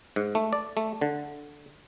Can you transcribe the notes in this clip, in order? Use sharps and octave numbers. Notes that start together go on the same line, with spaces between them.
G#2
A3
D5
A3
D3